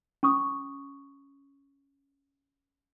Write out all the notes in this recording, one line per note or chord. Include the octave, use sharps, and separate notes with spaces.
C#4 C#6 D#6